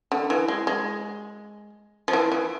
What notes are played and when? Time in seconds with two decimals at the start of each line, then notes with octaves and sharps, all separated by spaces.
0.12 D3
0.30 E3
0.48 G#3
0.67 G#3
2.08 F3
2.13 E3
2.32 E3